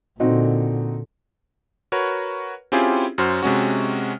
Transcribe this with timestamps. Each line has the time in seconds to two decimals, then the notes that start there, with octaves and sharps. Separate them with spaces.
0.20 A#2 D3 C4 D#4 F#4
1.92 F#4 A#4 B4 C#5
2.72 C4 C#4 E4 F4 G4 G#4
3.18 F#2 F#4 C5 F6
3.43 C3 G#3 C#4 F#4